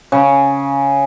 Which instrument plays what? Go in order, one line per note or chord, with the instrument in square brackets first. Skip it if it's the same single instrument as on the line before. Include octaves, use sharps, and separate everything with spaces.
[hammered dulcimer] C#3